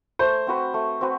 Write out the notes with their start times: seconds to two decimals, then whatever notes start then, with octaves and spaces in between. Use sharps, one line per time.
0.19 A3 C5
0.47 C4 F#4 B4
0.74 A3
1.01 C4 F#4 B4